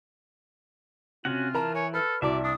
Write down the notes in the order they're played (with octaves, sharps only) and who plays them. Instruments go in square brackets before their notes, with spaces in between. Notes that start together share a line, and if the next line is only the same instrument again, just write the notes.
[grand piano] C3 [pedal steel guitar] C#4 F#4 F#5 [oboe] F4
[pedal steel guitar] E3 [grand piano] A#4 A#5 [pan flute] A5
[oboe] C#5 [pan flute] G#5
[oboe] A4 [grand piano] B4 [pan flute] F6
[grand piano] C2 A5 D6 [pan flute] F#4 [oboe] D5 [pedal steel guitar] E5
[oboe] D4 [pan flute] D#6